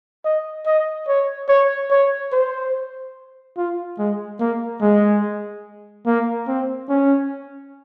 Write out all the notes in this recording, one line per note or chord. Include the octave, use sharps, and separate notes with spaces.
D#5
D#5
C#5
C#5
C#5
C5
F4
G#3
A#3
G#3
A#3
C4
C#4